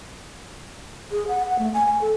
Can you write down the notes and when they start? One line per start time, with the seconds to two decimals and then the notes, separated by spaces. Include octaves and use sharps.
1.11 G#4
1.28 F#5
1.45 F#5
1.59 A3
1.74 G#5
1.87 G#5
2.01 A4